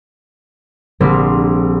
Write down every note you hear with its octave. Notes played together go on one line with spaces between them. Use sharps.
A#1 D3 G3 A#3 C4